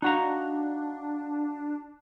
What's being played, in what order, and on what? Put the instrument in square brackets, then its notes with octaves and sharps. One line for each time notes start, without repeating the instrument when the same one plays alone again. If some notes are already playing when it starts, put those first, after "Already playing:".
[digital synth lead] D4 [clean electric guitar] D#4 F#4 A#5 [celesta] F5 F#5 F#6